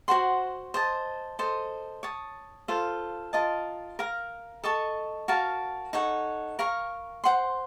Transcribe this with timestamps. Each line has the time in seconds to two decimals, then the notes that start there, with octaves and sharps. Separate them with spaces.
0.08 F#4 C5 F#5 C6
0.74 C5 D#5 A5
1.39 A4 C5 D#5
2.03 C#5 A5 D#6
2.68 F4 A4 C5 F5
3.33 F4 A#4 D#5 A5
3.99 A#4 F5 A#5
4.64 A4 D#5 A5 C#6
5.28 F#4 A#4 F5 A5
5.93 D#4 A4 C#5 F#5
6.59 A#4 F5 A#5 C#6
7.24 C5 F#5 C6